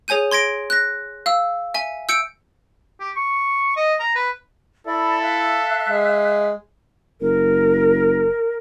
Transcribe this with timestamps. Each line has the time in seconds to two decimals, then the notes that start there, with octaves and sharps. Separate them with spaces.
0.08 G#4 C#5 G#5 G6 D#7
0.31 C6 G#6 A#6 D7
0.70 F#6 A#6
1.26 F5 E6
1.74 E5 G#5
2.09 E6 G6 C#7 D7
3.00 G4
3.16 C#6
3.76 D#5
4.00 A#5
4.15 B4
4.87 E4 A4 D5 B5
5.23 E5 F5 F#6
5.89 G#3
7.21 F#1 A#4